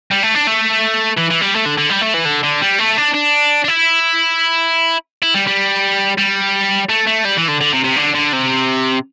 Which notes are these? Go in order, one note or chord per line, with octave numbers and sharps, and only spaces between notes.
G3
A3
D4
A3
E3
E3
G3
A3
D3
D3
G3
A3
E3
D3
D3
G3
A3
D4
D4
D4
E4
E4
G3
G3
G3
A3
A3
G3
E3
D3
D3
C3
C3
D3
D3
C3